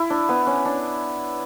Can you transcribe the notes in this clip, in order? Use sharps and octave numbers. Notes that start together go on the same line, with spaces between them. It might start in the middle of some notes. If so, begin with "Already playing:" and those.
Already playing: E4
D4
B3
C#4
D4